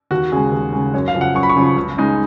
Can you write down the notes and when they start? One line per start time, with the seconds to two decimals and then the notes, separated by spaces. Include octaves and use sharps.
0.11 D#2 F#4
0.32 C#3 G#3 G#4
0.52 D#2
0.73 C#3 G#3
0.94 F#2 C#5
1.08 F5
1.15 C#3 F3
1.21 F#5
1.35 F#2 C#6
1.43 B5
1.49 C#6
1.56 C#3 F3
1.76 C#2
1.97 C#3 G#3 D#4